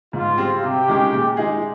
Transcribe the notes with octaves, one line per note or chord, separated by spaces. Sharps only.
G#2 F4
G3 C4
C3 G4
D#3 G#3 C#4
A#2
G#3 D#4 G#4